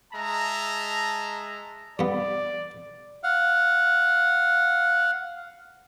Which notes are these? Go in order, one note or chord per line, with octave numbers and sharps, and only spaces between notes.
G#3 E5 A5 A#5
G2 B3 D5
F5 F#5